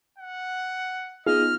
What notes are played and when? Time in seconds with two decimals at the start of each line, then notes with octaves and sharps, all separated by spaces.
0.18 F#5
1.27 B3 D#4 F4 G#4 D#5 F6